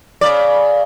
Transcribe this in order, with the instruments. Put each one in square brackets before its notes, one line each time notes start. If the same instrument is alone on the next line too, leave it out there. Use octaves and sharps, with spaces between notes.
[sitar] C#3 D5